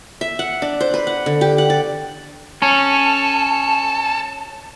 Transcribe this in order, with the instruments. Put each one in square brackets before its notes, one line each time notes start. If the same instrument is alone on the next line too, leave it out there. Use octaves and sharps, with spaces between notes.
[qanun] E5
F#5
D4
C5
B4
F#5
D3
G4
F#5
D5
[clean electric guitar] C#4 [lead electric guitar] A4